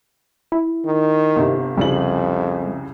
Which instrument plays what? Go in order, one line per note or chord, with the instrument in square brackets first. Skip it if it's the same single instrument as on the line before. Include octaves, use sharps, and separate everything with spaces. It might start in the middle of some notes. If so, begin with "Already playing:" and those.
[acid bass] E4
[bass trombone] D#3
[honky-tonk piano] G1 C3
[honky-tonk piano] C2 C#3 F#7 [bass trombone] F2 [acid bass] G3